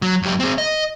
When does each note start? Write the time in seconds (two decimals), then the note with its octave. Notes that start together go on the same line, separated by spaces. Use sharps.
0.02 F#3
0.22 F#2 G4
0.40 C4 G#4
0.58 D#5